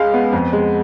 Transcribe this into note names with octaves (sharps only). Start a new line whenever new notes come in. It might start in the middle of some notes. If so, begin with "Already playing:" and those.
Already playing: C#2 G#3 F5
B3
F2
G#3